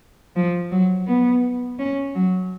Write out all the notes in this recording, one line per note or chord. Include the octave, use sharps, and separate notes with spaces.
F3
F#3
B3
C#4
F#3